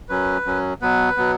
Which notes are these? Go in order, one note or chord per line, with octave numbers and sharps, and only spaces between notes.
F#2 F#3 C#4 B4
F#2 F#3 C#4
B2 F#3 B3 B4
B2 F#3 B3